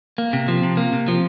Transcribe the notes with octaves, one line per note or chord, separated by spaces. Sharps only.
A#3
C3
F3
C3
A#3
C3
F3